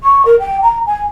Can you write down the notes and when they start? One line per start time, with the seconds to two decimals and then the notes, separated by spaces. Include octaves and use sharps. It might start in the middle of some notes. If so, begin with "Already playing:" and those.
0.04 C#6
0.26 A#4
0.40 G5
0.62 A#5
0.86 G#5